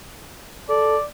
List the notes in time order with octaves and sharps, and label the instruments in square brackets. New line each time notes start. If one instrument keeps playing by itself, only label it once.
[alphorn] A4 [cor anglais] D5